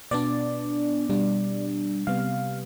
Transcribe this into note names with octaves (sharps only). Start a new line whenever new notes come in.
B2 B3 D4 D5
B2 G3 D4
C3 G3 B3 F5